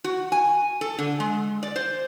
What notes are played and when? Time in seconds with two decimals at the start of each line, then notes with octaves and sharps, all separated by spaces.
0.04 F#4
0.32 G#5
0.81 A4
0.99 D3
1.20 G#3
1.63 D5
1.76 C5